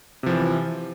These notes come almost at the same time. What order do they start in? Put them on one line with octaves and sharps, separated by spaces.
C3 F3 E3